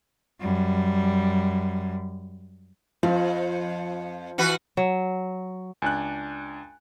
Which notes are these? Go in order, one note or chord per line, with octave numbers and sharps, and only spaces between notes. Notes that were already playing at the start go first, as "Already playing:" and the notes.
F#2 G3
F2 F3
E3 F#4 B4
F#3
C#2 D4 G#5 F#6